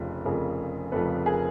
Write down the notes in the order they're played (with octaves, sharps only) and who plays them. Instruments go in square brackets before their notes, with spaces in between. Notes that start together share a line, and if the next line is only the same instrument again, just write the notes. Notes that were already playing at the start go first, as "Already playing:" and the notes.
Already playing: [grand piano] F1 F2 C#3 F3
F1 F2 C#3 F3 G#4 A#4
F1 F2 C#3 F3 A4 B4
G#4 A#4